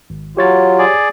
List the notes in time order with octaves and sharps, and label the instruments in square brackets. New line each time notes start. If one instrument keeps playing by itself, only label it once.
[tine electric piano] G#1
[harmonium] F#3 F4 [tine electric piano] G4 C#5 A6
[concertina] G#4 D5